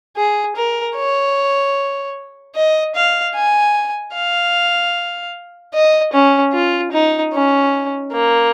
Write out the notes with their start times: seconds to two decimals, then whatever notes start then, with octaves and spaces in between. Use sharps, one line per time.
0.17 G#4
0.56 A#4
0.96 C#5
2.56 D#5
2.95 F5
3.35 G#5
4.14 F5
5.74 D#5
6.13 C#4
6.53 F4
6.92 D#4
7.33 C#4
8.12 A#3